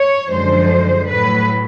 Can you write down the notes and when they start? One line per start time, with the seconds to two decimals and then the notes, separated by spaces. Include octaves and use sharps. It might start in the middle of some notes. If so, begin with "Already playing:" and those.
Already playing: C#5
0.31 F#2 D3 F3 G#3 C5
1.08 A2 F#3 B4